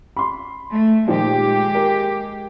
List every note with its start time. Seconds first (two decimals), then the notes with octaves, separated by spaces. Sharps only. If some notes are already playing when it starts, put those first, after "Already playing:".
0.17 B5 C6
0.71 A3
1.08 A#2 D#3 F3 G#3 G4
1.75 A#4